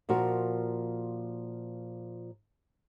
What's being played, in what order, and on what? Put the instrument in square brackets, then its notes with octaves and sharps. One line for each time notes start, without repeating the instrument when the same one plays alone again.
[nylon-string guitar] A#2 F3 F#4 A#4